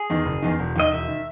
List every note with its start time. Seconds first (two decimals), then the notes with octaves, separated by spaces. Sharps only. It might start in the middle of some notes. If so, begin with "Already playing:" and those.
Already playing: G#4
0.10 E2 D#3
0.25 F#1
0.42 E2 D#3
0.59 E1
0.76 D#2 D#3 D#5
0.92 E1 E5
1.08 D#3